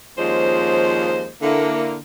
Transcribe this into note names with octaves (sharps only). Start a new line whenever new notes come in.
D#2 F3 G#3 C#4 C5 D#5
D3 A#3 E4